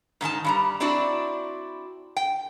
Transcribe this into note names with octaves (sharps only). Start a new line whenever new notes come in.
G#2 D#3 D#4 A5
G2 G3 A#5
C4 D4 E4 F#4 D5
G5